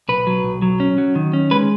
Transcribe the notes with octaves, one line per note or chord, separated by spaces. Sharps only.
B1 B4
F#3
B1
F#3
C#4
F#3
D#3
C#4
G#3 B4